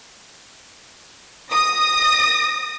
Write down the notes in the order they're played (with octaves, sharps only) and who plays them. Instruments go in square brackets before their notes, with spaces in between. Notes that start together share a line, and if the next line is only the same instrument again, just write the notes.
[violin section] D#6 A#6